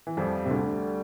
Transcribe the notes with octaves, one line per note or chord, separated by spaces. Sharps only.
E3
F2 F3 G3
C3
D2 D3 G3